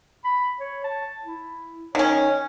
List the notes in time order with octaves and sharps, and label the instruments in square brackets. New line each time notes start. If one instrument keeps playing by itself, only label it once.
[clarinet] B5
C#5
A5
E4
[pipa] D#3 C#4 [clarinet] C#5